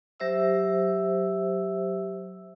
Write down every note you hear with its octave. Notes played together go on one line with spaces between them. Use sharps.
F#3 G4 C5 E5 E6